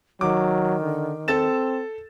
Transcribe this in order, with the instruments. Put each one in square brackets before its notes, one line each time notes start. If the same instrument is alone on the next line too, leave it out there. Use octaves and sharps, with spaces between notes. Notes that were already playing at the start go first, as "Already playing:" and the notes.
[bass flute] D#3 [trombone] F#3 [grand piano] D6
[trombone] D3
[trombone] C4 [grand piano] A4 A6 E7